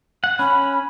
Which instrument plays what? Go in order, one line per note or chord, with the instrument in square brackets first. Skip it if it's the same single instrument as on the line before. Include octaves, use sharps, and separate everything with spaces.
[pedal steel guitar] F#5
[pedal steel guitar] C#4 [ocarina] B5